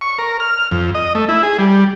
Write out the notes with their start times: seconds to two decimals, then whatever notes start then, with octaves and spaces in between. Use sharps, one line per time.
0.01 C#6
0.18 A#4
0.40 F6
0.71 F2
0.95 D#5
1.15 A3
1.29 E4
1.43 G#4
1.59 G3